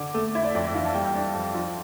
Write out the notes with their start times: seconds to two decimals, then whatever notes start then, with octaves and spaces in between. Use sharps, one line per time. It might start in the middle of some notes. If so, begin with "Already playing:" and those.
Already playing: D3 D6
0.14 A3
0.35 E4 E5
0.44 D5
0.55 F2 D5
0.64 E5
0.74 E3 F5
0.85 A5
0.94 G3 G5
1.04 G5
1.15 D4
1.34 F2
1.54 F3